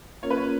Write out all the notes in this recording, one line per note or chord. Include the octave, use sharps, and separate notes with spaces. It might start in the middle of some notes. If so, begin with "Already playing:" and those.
A#3 C#4 F4 A#4 C#5
B4
C#5